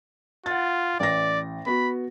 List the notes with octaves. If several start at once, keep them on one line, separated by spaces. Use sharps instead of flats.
F4 F#5 A6
A1 D5 A#6
B3 F#4 B5